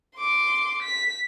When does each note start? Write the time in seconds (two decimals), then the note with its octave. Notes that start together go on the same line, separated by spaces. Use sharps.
0.17 C6 D6
0.82 B6